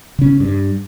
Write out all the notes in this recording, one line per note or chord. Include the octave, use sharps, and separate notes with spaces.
C#3 C#4
G2